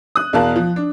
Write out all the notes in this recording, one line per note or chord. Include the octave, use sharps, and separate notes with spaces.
D#6 F#6
E2 B2 A#4 F5 A5 F#6
F3
D4